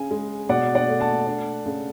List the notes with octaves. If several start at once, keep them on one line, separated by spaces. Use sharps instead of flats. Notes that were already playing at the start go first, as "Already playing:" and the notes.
Already playing: C#3 G#5
G#3
B2 D5 F#5
D5 F#5
A3
F#5 A5
D4
C#3